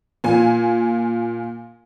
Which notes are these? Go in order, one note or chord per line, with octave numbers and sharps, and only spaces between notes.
A#2 G#5